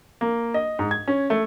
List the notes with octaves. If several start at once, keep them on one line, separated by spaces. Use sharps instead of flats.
A#3
D#5
G#2
G#6
C#4
A3